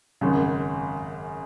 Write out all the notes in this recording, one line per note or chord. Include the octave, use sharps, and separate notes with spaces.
G#1 F#2 C#3